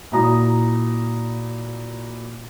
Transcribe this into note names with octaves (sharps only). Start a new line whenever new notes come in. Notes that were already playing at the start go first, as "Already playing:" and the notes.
A#2 E4 F#4 A#5 D#6